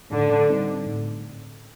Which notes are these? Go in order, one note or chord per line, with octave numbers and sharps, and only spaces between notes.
A2 D3
G3 C4 D#4
A2